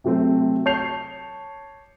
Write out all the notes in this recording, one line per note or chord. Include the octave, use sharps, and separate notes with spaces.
C3 F#3 A3 C4
C#5 A5 G6 C7 F7